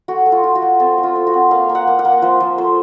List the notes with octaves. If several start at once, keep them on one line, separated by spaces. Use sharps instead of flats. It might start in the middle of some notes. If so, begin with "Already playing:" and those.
A3 F#4
A3
F4
F4
F#4
A3
C4 A4
A3
F4
C4
F#4
C4
A#3 F5
A#3
F#5
A#3
F#5
A#3
F3 C5
F3
A3 C5